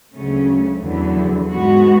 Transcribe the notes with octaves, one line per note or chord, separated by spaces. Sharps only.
D2 C#3 F#3 A3 C#4
E2 D3 F#3
G#2 G#3 B3 F#4